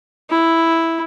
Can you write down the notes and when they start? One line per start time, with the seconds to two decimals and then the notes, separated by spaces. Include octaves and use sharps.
0.30 E4